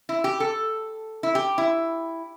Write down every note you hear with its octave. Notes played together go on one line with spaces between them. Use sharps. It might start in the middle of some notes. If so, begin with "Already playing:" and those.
E4
G4
A4
E4
G4
E4